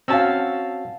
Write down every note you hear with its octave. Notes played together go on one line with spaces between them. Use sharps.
C4 C#4 F#4 F5 A5 E6